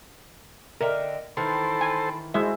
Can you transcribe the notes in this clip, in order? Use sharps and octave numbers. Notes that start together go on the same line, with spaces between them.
D3 A#4 D#5 E5 G5
D#3 E3 D#4 A4 C5 G5 B5
G#5
G#3 E4 F#4 C5 E5